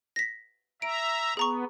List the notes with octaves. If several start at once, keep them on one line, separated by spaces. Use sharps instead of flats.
A#6 B6
E5 A#5 D7
B3 G#4 A#5 C#6